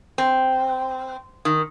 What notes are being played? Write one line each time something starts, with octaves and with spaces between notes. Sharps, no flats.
C4
D#3